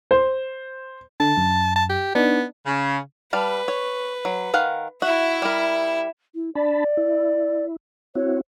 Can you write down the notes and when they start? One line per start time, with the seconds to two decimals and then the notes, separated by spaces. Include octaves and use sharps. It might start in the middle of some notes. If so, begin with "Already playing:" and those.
0.11 C5
1.20 D3 A5
1.37 F#2
1.76 A5
1.89 G4
2.15 B3 D4 D#4
2.66 C#3
3.33 G3 B4 F5 A5
3.68 C#5
4.25 F#3
4.54 D#3 F5 F#5
5.02 E4 F#4 E5
5.42 G3 A#4
6.35 E4
6.55 D4 D5 A5 B5
6.97 E4
8.15 C4 E4 F#4 C#5